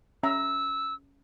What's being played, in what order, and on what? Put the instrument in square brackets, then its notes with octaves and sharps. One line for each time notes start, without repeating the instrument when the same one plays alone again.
[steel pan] C#4 E5 A#5 [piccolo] E6